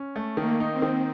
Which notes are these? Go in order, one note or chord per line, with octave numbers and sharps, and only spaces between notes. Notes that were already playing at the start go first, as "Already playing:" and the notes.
Already playing: C#4
A3
D#3 A#3
D#4
C4
D#3